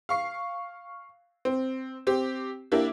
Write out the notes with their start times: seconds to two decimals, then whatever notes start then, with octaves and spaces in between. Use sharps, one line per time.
0.09 F5 C#6 C7
1.45 C4
2.07 C4 G4
2.72 A#3 D4 E4 G4